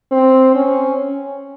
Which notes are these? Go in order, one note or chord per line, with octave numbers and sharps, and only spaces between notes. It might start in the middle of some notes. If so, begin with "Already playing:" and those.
C4
C#4